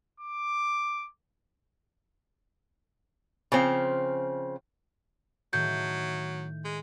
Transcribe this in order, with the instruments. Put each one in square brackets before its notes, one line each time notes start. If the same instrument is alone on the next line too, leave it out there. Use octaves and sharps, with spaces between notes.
[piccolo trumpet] D6
[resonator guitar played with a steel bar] C#3 F3 C4
[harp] A2 D#3 A3 [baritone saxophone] F#3 [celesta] G6
[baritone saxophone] G#3